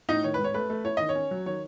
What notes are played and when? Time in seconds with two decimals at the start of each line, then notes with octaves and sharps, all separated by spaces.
0.09 A2 D#4 D#5
0.24 D#3 C#5
0.34 B4
0.39 G#2
0.44 C#5
0.54 A3 B4
0.70 A3
0.85 E4 C#5
0.97 D#3 D#5
1.09 C#5
1.15 C#4
1.31 F#3
1.46 D#3 C#5